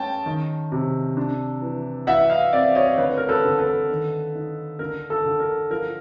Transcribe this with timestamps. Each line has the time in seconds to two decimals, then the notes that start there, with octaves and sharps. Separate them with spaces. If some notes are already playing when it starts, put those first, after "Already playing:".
Already playing: G#3 C#4 G5 A5
0.26 D#3
0.72 C3
1.17 D4
1.62 E3
2.07 E3 E5 F#5
2.30 D#5 F5
2.53 C4 D5 E5
2.75 C#5 D#5
2.98 D3 B4 C#5
3.18 A#4
3.29 A4 B4
3.44 D3
3.59 A4 B4
3.89 D#3
4.35 D#4
4.79 D3 A#4
5.10 A4
5.25 D3
5.40 A#4
5.70 F3 A#4